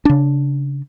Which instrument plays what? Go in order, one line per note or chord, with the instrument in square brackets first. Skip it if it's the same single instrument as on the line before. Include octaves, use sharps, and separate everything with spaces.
[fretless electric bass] C#3 D4